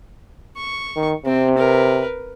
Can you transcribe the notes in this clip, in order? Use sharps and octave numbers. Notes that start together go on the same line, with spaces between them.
C#6
D#3
C3 C4
A#4 B4